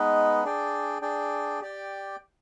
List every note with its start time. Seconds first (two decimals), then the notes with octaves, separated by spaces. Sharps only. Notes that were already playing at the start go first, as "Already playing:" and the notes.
Already playing: G#3 B3 D#4 B4 D#5
0.43 D4 G#4 D5 G5
1.02 D4 G#4 D5 G5
1.61 G4 D5 G5